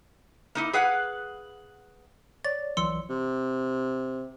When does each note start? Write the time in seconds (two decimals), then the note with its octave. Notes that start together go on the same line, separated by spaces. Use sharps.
0.55 A#3 D#4 E4
0.73 G#4 B4 F5 F#5
2.45 C#5 D5 A6
2.77 C2 E3 F#3 C6 E6 C#7
3.10 C3